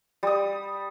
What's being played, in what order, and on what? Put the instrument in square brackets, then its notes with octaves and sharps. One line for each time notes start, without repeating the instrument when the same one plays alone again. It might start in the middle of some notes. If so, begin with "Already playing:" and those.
[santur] G3 D#6